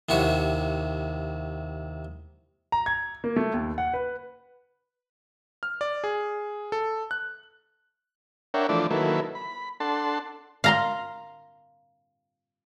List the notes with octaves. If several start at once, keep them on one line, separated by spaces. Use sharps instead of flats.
D#2 C3 E4 F#4 C#5
A#5
G#6
A#3
A3
D#2
F#5
B4
F6
D5
G#4
A4
F#6
D4 A#4 C#5 E5 F#5 G5
E3 F3 A3 D4 D5
D#3 F#3 A#3 E4 A4 B4
B5
D4 A4 F#5 A5 C6
F5 A#5 C6